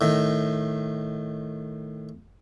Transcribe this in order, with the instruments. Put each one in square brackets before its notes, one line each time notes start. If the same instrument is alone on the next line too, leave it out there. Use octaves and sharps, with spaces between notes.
[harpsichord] A2 D#3